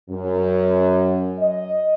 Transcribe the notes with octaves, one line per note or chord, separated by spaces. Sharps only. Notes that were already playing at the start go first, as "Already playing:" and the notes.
F#2
D#5